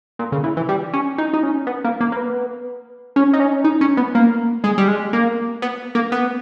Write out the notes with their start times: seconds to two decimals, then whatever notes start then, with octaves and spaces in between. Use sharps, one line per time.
0.19 A#2
0.32 C#3
0.44 E3
0.57 E3
0.69 G3
0.93 C#4
1.18 D#4
1.33 D#4
1.43 C#4
1.67 B3
1.84 A#3
2.01 A#3
2.12 A#3
2.16 B3
3.16 C#4
3.33 D#4
3.40 C#4
3.64 D#4
3.81 C#4
3.97 B3
4.15 A#3
4.64 G#3
4.78 G3
4.88 G#3
5.13 A#3
5.62 B3
5.95 A#3
6.12 B3